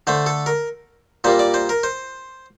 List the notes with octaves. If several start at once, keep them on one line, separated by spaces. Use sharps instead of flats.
D3 A3 C5
A4
A#4
A#2 G3 A#3 C5
D5
C5
A#4
C5